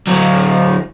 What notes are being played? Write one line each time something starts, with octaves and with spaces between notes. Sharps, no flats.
D2 F#3